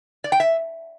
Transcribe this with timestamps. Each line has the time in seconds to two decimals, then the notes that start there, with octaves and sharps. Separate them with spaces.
0.24 D5
0.32 G5
0.40 E5